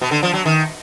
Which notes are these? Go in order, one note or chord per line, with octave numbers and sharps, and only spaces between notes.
B2
D3
F3
F#3
D#3